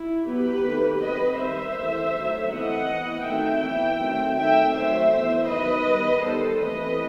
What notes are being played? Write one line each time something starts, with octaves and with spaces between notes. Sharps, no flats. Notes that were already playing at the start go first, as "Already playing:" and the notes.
Already playing: E4
F#3 B3 G4 B4
D#3 A3 C4
F#3 C4 B4 D#5
D#3 G3 C4 C5 E5
E3 A3 C4
D#3 F#3 A3
E3 A3 C4 D#5 F#5
E3 B3
D#3 F#3 A3 C4 E5 G5
E3 B3
D#3 F#3 A3 C4
D#3 A3 C4 E5 G5
F#3 A3 C4 C5 E5
E3 B3
D#3 F#3 B3 B4 D#5
D#3 G3 B3
D#3 G3 B3 A4 C5
E3 A3 C4 B4 D#5